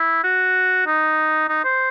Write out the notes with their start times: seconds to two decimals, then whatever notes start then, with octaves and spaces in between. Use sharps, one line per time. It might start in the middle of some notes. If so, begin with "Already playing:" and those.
Already playing: E4
0.24 F#4
0.87 D#4
1.49 D#4
1.64 C5